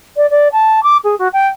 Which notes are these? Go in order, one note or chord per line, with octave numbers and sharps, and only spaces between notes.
D5
D5
A5
D6
G#4
F#4
G5